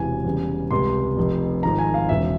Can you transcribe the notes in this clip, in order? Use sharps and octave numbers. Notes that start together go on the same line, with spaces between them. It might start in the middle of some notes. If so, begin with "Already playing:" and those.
Already playing: E1 E2 C3 E3 G#5
E2 C#3 G3
C#2 C3 G3 C6
F1 F2 C3
G#1 G#2 F3 G#3 A#5
G#5
F5
E1 E2 C#3 E5